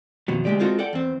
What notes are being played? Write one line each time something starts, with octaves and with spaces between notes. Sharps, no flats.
F2 B2 D#3 F#3
D2 G2 G#3 G4 D5
G#3 C4 F4 F#4 A4
A4 D5 F#5 G5
E2 C4